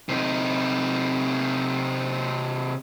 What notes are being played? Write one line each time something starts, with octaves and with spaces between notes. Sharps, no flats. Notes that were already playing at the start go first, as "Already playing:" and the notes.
C3 D#4